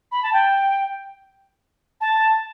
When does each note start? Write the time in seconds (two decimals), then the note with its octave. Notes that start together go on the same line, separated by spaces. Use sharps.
0.12 B5
0.23 A5
0.33 G5
2.01 A5